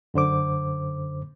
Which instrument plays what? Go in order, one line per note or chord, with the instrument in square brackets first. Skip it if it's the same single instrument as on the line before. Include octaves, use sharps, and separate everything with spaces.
[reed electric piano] F#2 D3 C5 D6